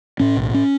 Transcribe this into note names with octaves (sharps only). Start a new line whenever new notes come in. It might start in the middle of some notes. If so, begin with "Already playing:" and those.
A2 C#4
B1
C#4